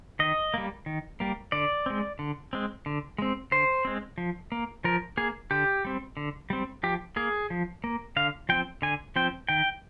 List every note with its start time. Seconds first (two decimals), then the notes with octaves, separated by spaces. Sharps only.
0.19 D#3 D#5
0.54 G3 A#3
0.86 D#3
1.20 G3 A#3
1.52 D3 D5
1.86 G#3 C4
2.19 D3
2.53 G#3 C4
2.86 D3
3.18 G#3 C4
3.52 D3 C5
3.85 G#3 C4
4.18 F3
4.52 A#3
4.84 F3 A#4
5.17 A#3 G#4
5.51 D3 G4
5.85 G3 C4
6.17 D3
6.50 G3 C4
6.83 F3 G4
7.16 A#3 G#4
7.50 F3
7.84 A#3
8.16 D3 F5
8.49 F3 C4 G5
8.82 D3 G#5
9.16 F3 C4 G5
9.49 D#3 G5